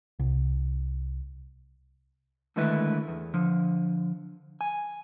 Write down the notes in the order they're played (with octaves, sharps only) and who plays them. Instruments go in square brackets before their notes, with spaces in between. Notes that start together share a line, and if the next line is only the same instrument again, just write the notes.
[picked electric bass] C2
[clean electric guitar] D3 D#3 G#3 A3 E4 B4
E2
D3 F3
G#5